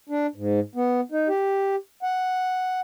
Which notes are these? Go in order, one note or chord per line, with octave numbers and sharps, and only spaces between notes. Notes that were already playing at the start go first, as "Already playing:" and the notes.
D4
G#2
B3
D#4
G4
F#5